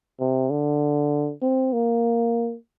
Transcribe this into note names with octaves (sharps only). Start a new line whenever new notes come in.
C3
D3
C4
A#3